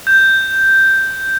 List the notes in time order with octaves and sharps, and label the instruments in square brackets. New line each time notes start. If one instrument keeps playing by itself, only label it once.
[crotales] G6